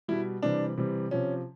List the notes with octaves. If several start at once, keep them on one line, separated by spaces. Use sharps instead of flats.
B2 G3 E4
C3 E3 G3 D4
C3 E3 G3
C3 F3 C#4